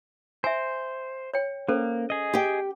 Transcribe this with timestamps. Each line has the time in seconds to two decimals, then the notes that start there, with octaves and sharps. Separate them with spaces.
0.44 C5 E5 G#5
1.34 C#5 G5
1.68 A#3 C#4 A4 C5
2.10 G#4 D#5
2.33 G4 G5